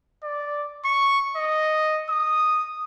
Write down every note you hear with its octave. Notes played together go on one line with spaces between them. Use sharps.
D5
C#6
D#5
D#6